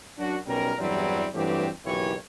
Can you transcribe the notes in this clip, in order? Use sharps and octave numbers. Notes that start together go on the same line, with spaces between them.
F#2 D4 F#4
B1 B2 G3 C#4 A#4
E2 G2 E3 F#3 G3 C4
G2 E3 F#3 A3 C4 G4
F#1 B1 D#3 E3 G4 C#5